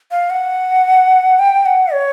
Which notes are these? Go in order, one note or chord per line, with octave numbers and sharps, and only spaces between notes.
F5
F#5
G5
F#5
C#5